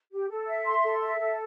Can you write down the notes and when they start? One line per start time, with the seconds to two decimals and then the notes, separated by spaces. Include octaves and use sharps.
0.11 G4
0.28 A4
0.47 E5
0.64 C6
0.82 A4
1.01 E5
1.19 A4